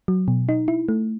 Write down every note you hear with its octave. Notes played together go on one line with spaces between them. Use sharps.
F#3
B2
D#4
E4
A3